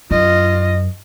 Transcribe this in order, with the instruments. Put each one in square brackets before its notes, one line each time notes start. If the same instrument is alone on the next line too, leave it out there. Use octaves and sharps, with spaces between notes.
[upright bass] F#2 [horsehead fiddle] F4 D#5